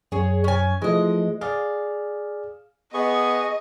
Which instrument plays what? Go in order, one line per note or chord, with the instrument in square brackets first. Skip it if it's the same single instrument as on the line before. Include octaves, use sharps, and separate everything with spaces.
[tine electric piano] F#2 [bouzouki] G#4 C#5
[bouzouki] C#4 G#5
[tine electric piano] E3 F3 A3 [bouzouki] G#3 D#5
[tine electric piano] G#4 D5 [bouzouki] F5
[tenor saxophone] B3 [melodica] G#4 C#6 [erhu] D#5